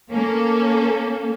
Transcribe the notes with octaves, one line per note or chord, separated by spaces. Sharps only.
A#3 C#4 A4